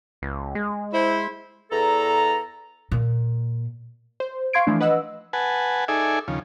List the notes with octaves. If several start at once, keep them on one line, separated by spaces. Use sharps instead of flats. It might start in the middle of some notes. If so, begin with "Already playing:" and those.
C#2
G#3
E4 C5
E2 A4 A#5
A#2
C5
F5 C6 C#6 G#6 C7 D7
E3 F3 A3 D4
B4 D#5 F#5 E6
B4 F#5 G#5 A5
D#4 G#4 A4 D5 E5 G#5
D#2 C#3 F3